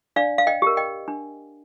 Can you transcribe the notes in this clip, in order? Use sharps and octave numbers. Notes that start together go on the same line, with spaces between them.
D4 D5 F5
F5
D#5 G5
G4 A#4
D#5 G5
D4